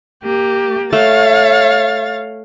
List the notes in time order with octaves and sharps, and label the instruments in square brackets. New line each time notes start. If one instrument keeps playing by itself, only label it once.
[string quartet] A#3 G4
[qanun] A3 [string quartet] C#5 F5 A6